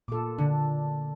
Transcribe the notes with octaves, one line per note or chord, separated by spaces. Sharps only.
A#2 F4 A4 D6
D3 D4